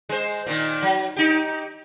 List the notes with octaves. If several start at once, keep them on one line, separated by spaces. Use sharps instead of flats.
G#3 C5
A#2 D#3
F#3
D#4 G4